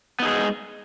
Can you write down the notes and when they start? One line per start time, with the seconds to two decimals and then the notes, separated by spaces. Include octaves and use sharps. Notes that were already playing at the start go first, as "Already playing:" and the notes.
0.20 B3
0.22 D#4
0.25 G#4
0.28 G#3